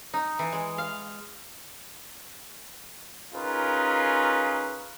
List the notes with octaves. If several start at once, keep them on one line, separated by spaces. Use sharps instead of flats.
D#4
E3
G#3
F5
C#4 D#4 F4 G#4 A#4 B4